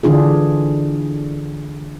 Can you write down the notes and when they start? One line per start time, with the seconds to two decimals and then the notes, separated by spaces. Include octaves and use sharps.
0.03 D3 E3 D4 F4 G#4